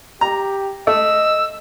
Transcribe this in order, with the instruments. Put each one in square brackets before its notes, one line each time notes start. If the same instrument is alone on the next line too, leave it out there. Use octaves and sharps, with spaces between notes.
[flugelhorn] G4 [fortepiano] A#5
[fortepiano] A3 [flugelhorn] D#5 [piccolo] E6